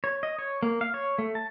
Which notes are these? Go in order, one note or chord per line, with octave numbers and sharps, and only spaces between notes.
C#5
D#5
C#5
A#3
F5
C#5
A3
A5